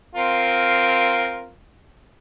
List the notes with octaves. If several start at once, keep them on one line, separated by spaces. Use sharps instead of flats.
C4 F4 A#4